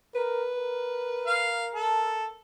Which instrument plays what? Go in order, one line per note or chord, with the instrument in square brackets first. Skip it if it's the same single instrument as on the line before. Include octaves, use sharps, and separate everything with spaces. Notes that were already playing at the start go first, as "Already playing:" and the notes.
[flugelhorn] A#4 [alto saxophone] B4
[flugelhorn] A#4
[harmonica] F5
A4